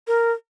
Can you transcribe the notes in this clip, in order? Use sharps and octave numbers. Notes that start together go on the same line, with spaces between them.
A#4